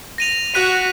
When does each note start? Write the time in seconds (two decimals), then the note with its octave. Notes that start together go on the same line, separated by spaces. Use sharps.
0.18 A#6 D#7 F7
0.54 F#4 F#6 B6 D#7